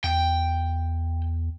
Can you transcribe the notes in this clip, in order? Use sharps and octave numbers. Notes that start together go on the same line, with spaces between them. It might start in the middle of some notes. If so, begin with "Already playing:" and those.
E2 G5